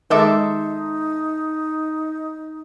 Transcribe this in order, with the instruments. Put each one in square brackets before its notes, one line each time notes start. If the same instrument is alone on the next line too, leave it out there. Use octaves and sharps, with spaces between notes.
[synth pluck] D#3 G#3 D6 [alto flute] D#4 [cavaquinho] A4 E5 C6